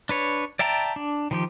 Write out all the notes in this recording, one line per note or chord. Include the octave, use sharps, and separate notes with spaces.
D4 B4 C#5
D5 E5 G5 A5 A#5
D4
D#3 F3 G4